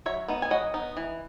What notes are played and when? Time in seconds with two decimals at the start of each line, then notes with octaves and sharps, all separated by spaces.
0.06 F#3 C#5 E5
0.28 B3 D#4
0.42 G#5
0.51 F#3 D#5 F#5
0.74 B3 D#4
0.97 E3